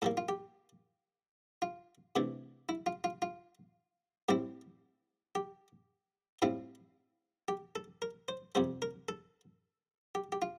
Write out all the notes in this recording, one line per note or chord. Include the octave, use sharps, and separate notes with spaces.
A2 G3 A#3 A4
F4
G4
F4
C3 E3 A3 D4
E4
F4
F4
F4
A2 G3 C4 E4 G4
G4
A2 G3 C4 E4 F4
G4
A4
A#4
C5
F2 C3 G3 C5
A#4
A4
G4
G4
F4